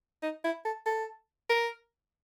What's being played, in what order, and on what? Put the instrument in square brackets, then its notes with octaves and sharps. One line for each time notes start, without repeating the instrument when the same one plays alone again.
[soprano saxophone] D#4
E4
A4
A4
A#4